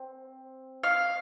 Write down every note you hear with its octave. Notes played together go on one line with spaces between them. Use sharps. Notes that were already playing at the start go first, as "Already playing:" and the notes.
Already playing: C4
F5